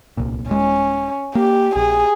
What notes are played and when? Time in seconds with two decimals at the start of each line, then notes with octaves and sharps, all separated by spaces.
0.17 D1 C2 A#2
0.49 D#1 G#3 C#4
1.35 A#3 G4
1.76 A#1 G#4